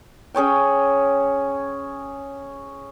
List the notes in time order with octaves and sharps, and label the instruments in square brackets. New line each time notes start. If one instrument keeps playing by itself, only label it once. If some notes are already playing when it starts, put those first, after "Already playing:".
[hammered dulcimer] C#4 G#4 C#5 G5